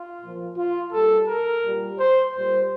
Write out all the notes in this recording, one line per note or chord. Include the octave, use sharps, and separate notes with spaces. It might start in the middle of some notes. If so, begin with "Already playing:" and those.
Already playing: F4
A#2 F3
F4
A#2 G3 A4
A#4
A#2 G3
C5
A#2 G3 C5